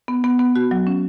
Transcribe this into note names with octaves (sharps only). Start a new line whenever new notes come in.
B3
B3
B3
F#4
F#3
C#4